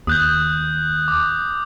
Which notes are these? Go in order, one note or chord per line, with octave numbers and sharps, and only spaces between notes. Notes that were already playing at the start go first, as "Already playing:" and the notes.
D#2 D#6 F#6 G6
D6